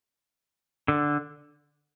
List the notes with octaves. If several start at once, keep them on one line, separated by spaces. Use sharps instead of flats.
D3